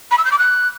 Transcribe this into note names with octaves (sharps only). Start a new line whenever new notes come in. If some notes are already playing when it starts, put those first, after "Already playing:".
B5
E6
G6
D6
F#6